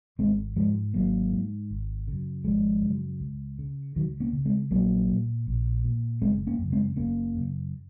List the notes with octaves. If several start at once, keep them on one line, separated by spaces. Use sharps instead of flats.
G#1 G#3 C4
G#2 F3 G#3
G#1 F#3 A#3
G#2
G#1
F#2 C#3
G#1 F3 G#3
F#2 C#3
C#2
C#3
C#2 D#3 F#3
A#3 C#4
C#3
G#3 C4
A#1 F#3 A#3
A#2
A#1
A#2
F#1 G#3 C4
A#3 C#4
F#2
C#3
G#3 C4
F#1 A#3 C#4
F#2 C#3